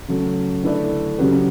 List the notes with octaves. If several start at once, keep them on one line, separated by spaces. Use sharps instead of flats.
C#3 F#3 A3
D3 A3 E4 B4 D5
C#3 F#3 C#4 G4 B4